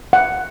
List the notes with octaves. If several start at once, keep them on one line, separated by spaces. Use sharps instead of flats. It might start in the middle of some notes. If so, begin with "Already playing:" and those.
F#5